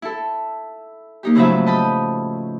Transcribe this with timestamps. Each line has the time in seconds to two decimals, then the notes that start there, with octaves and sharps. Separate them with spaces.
0.02 E4 A4
1.23 A#3 D#4 G4
1.35 A2 C#3 F3 F#3 B4 E5
1.66 D#5 G5 A5 B5 D#6